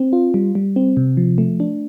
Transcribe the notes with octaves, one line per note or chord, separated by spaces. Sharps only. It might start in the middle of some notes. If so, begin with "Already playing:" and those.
Already playing: C4
F4
G3
G3
C4
C3
F3
A3
D4